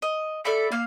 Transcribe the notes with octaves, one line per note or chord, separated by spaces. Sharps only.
D#5
A4 D5 E5 B5
A#3 F5